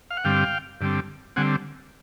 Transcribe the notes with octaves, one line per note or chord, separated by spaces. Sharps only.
F5
F#5
G2 D3 G3 C4 F5 G5
G2 D3 G3 C4
D3 G3 C4 F#5 G#5